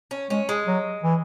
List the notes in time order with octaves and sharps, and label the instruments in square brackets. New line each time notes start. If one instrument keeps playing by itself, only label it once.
[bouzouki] C#4
[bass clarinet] G#3 [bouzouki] C#4
[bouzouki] G#3
[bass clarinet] F#3
E3